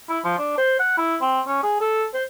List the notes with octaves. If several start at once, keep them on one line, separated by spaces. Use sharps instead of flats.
E4
F3
D4
C5
F#5
E4
C4
C#4
G#4
A4
C5